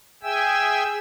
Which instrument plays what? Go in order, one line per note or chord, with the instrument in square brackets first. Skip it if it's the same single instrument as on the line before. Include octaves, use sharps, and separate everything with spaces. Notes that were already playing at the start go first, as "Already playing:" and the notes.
[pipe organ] G#4 E5 G5 G#5 E6